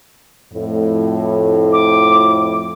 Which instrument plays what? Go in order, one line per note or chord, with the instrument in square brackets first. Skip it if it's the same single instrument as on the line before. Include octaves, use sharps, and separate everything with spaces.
[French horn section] F2 A2
[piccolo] D6